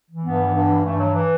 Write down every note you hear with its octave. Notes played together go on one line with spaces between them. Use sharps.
E3
G2 B3
E3
G2
E3
G2 A3
E3 F#3
E3